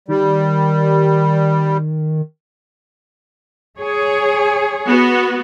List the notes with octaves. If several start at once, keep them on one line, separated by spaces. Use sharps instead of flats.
D#3 G3
G#4 C#5
B3 F#4